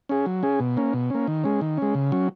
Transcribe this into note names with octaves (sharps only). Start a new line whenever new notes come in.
C#4 G#4
F#3
C#4 G#4
B2
A#3 C#4
B2
A#3 C#4
D#3
G#3 C#4
D#3
G#3 C#4
C#3
F#3 C#4